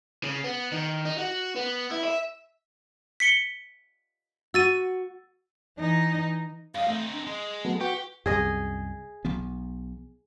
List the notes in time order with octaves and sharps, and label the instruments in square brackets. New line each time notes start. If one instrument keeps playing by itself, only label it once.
[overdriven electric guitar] C#3
B3
D#3
D#4
F#4
B3
E4
E5
[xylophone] B6 C#7 G7
[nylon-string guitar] F#4 [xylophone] E6 A6 D#7
[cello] E3 D#4
[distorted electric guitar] G2 D#5 [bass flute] F5
[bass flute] A3 [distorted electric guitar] C4 D#4
[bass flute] D4
[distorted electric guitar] G#3 [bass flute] D#5
[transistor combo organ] F#3 A3 B3
[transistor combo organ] F#4 G5 C#6 [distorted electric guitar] G4 [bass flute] B4
[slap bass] C2 F#2 [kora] G#4 D#5
[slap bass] B1 F3 B3